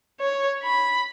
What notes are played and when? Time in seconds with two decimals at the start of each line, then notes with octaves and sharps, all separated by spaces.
0.20 C#5
0.63 B5